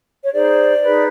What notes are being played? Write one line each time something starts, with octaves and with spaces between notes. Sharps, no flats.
C#5
D#4 G#4 C5 D5
D#4 G#4 B4